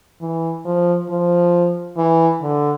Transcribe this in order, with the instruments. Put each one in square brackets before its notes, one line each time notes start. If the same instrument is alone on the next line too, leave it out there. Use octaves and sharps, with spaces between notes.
[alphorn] E3
F3
F3
E3
D3